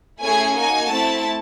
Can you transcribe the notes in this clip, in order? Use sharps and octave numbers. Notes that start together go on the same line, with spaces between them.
A3 C#4 E4 G#4 G#5
A#3 D#4 F#4 G#5
A3 C4 E4 A5